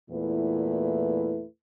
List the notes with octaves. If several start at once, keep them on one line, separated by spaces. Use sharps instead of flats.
E2 A#2 A3 E4 B4